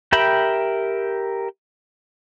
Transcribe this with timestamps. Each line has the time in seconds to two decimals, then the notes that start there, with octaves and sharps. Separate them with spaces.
0.12 G4 A#4 E5 G5 B5